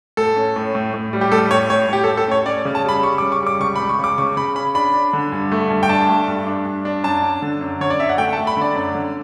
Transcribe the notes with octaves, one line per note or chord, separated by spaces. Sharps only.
A2 A4
C#4
A2
A2
A2
G3
G4
A2 A4
A2 C#5
A2 C#5
A2 G4
A4
A2
A4
C#4 C#5
C#4 D5
C#3
A5
G3 B5
G3 C#6
D6
C#3
C#6
G3 D6
C#2 C#6
B5
C#2
C#6
C#3 D6
C#3 C#6
C#3 B5
C#4 B5
D4 B5
D4
D3
G2
A3
G2
G5
D4 A5
A3
G2
D4
G2
D4
F#2 A5
D4
D3
F#2
D3 C#5
D5
F#2 E5
F#5
A3 G5
A5
A3
B5
D3 D5
F#2
D3